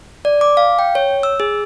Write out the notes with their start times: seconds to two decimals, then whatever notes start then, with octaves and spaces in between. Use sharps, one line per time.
0.25 D5
0.41 D6
0.57 F5
0.79 G5
0.95 C#5
1.23 E6
1.40 G#4